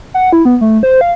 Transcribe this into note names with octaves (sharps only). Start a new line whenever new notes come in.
F#5
E4
B3
A3
C5
F5